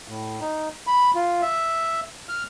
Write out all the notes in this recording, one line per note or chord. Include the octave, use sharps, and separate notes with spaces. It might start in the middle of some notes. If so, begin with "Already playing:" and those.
A2
D#4
B5
F4
E5
F6